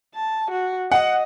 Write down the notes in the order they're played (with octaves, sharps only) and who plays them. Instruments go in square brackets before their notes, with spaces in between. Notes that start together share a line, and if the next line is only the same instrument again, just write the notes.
[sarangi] A5
F#4
[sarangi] D#5 [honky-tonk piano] F#5